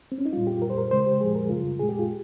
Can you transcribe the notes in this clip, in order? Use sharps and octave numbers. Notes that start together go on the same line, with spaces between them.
C4
C#4
D#4
A#2 G3 F4
G4
A#2 G3 A#4
C5
A#4
C#3 G#3 C5
G4
A#2 F3 G#3 G#4
A#4
C#3 G3 F4
A#2 G#3 G#4
G4
F4